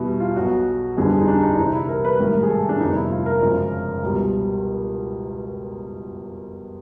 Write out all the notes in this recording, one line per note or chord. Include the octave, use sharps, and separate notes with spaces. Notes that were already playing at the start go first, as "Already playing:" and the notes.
Already playing: E2 B2 G3 E4
F4
B1 B2 F#3 F#4
G1 F2 D3 G3 G#4
G#4
D#4
D4
D#4
C2 C3 E3 G3 D#4
E4
A#4
B4
A1 G#2 D#3 G3 A#4
G#4
A4
D4
G1 F2 C3 D#4
E4
F4
A#4
G#1 F#2 C#3 F3
C#2 B2 G3